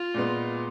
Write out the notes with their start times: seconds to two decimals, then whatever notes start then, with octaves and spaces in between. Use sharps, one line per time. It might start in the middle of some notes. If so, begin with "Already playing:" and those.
Already playing: F4
0.14 A#2 G#3 B3